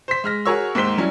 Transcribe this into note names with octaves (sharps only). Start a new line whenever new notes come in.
C5 B6
G#3 F6 A#6
F#4 G#4 A#4 C#5 C#6 E6
D#2 G#2 C5 B6 G7
F#3 G3 C#4 E4